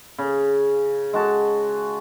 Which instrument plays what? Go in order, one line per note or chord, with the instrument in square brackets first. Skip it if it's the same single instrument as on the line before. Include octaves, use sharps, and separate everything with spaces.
[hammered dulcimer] C#3
G#3 F#4 A5